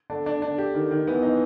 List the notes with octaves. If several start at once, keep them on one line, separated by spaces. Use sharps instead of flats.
D3 D4
D4
D3 D4
G4
D#3
D#3
E3 B3
D#4